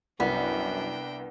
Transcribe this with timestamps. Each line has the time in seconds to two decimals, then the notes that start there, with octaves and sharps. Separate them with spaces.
0.20 C2 F#2 B3 D4 G5